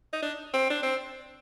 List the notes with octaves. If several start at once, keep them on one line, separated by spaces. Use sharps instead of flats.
D#4
D4
C4
D4
C4